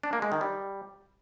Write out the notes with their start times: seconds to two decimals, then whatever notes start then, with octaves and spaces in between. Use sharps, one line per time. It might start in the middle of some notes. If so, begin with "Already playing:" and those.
0.03 D4
0.13 A#3
0.22 G#3
0.32 D#3
0.41 G3